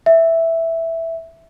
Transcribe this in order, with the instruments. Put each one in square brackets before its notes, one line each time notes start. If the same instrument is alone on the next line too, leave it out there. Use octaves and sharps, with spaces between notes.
[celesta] E5